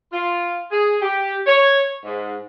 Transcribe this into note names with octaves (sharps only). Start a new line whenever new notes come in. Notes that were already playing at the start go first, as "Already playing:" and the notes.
F4
G#4
G4
C#5
G#2